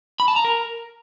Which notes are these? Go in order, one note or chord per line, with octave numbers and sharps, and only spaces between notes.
B5
A5
A#5
A#4